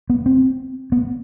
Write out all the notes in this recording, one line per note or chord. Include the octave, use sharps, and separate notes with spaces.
B3
C4
B3